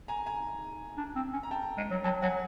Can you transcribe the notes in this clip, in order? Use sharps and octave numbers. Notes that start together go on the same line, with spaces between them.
G#5 A#5
G#5 A#5
D4
C4
C#4
A#5
G5 A5
G#3
F#3
F#3 G5 A5
F#3 F#5 G#5